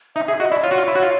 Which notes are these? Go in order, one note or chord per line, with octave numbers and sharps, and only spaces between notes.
D#4 E5
G#4 E5
F#4 D#5
E4 D5
F4 C#5
F#4
F4
E4
F#4
F4